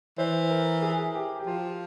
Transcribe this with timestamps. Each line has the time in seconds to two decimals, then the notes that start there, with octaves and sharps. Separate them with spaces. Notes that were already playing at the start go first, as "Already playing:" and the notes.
0.18 E3 C5
0.50 A#4
0.82 G#4
1.15 G4
1.40 G4
1.47 F3 F4